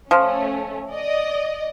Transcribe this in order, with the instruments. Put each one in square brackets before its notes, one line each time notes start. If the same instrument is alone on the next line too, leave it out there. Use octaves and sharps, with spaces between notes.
[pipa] F3 [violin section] A3 C#4
[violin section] D5 D#5